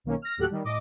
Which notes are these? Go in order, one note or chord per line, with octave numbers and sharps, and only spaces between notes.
B1 D#3 A#3 C#4
F6 A#6
D#2 A2 F#3 G4 A4 F#6
D#3 G3
A2 D#5 D6